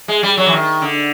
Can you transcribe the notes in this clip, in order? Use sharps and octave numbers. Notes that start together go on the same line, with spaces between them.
G#3
G3
F#3
E3
D#3
D3